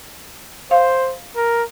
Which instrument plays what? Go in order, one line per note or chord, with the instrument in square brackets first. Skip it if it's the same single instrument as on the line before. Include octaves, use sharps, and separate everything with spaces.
[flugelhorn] C5 [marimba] F5
[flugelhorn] A#4